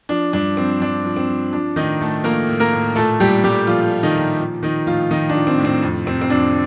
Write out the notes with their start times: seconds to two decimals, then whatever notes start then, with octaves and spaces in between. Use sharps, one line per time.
0.09 F3 D4
0.33 G2 D4
0.57 F3 C4
0.81 G2 D4
1.05 F3
1.16 C4
1.29 F3
1.53 F3 D4
1.76 A2 D#3 D#4
2.00 A2 A3 A4
2.24 F3 A#3 A#4
2.49 A2
2.60 A#3 A#4
2.73 A2
2.95 A#2 A3 A4
3.20 A#2 G3 G4
3.43 A#2 G3 G4
3.67 A#2 F3 F4
3.92 A#2
4.03 D#3 D#4
4.15 A#2
4.39 F3
4.63 D#3 F3 D#4
4.87 A2 F3 F4
5.11 D#3 F3 D#4
5.29 D4
5.35 F3
5.47 C4
5.59 A2
5.65 C4
5.83 F2
6.06 C3 C4
6.22 C4
6.30 F2 D4